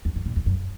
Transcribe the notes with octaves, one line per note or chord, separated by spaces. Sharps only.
E2
F#2
A#2
E2
F#2